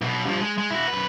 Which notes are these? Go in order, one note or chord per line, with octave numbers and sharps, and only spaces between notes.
B1 B2
G2 F3
G#3
G#3
E4 F#4
F#2 B4